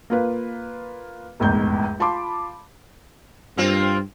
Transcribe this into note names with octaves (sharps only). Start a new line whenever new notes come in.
A#3 F4 B4
F1 A#1 E2 G#2 G6
F4 A5 B5 C6 D6
G2 A#3 C4 F4